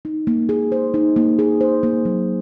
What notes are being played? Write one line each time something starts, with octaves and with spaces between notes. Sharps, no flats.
D#4
A#3
G#4
C5
D#4
A#3
G#4
C5
A#3
F#3